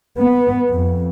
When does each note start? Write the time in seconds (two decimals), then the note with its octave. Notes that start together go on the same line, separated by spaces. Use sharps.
0.16 B3
0.71 F2